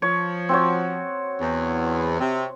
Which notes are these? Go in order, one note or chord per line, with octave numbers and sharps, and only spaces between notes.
F3 C#5
C4 F#4 C#5
E2
C3